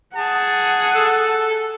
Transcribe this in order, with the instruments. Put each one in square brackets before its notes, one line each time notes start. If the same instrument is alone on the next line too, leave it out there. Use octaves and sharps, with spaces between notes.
[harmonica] G#4 [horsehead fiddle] F#5 [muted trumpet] A5
[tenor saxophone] A4